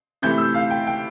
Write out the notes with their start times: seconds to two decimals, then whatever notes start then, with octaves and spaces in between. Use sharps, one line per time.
0.22 C3 E3 A3 G6
0.38 E6
0.54 F5
0.70 G5
0.87 G5